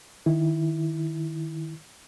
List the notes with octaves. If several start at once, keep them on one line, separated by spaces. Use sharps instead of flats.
D#3 E4